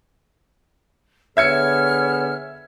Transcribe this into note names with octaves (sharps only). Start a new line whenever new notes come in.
D3 B3 G#4 C#5 E5 F6 G#6 C#7